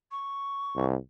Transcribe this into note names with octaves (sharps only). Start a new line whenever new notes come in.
C#6
C2